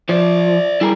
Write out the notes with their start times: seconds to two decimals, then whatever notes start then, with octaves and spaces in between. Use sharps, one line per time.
0.09 F3 C5 D5
0.81 G3 E4 G#4 A#4